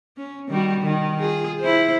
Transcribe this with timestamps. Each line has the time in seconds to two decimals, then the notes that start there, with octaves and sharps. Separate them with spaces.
0.17 C#4
0.48 D#3 G3 F#4
0.80 D#3
1.19 F4 G#4
1.60 E4 C5